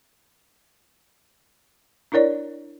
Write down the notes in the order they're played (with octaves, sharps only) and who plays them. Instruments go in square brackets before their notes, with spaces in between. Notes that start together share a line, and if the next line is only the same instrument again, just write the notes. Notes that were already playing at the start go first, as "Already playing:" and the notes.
[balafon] D4 E4 A#4 C#5 D5